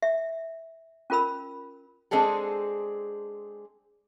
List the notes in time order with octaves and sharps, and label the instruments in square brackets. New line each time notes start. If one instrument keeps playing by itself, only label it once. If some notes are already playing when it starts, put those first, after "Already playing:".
[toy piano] E5
C#4 F4 A#4 B5 E6
[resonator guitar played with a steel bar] G#3 C4 D4 G#4 A4